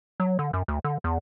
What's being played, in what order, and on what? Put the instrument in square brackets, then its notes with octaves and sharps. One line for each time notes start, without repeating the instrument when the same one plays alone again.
[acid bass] F#3
D3
F#2
D2
D3
E2